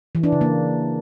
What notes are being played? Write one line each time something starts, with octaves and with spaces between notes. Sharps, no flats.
E3
D4
C#3
A#3